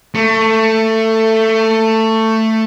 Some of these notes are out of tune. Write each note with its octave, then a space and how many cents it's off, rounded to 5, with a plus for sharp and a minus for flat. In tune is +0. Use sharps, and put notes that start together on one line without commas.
A3 +15